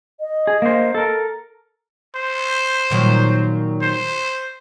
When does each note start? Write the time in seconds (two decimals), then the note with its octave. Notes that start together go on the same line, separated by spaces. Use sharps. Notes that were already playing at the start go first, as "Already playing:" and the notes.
0.20 D#5
0.47 G#4
0.62 A#3 C5
0.95 A4 A#4
2.15 C5
2.91 A#2 D#3 F#3
3.81 C5